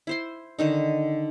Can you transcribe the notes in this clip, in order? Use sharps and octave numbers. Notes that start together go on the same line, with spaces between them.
E4 C5 C6
D3 D#3 D#4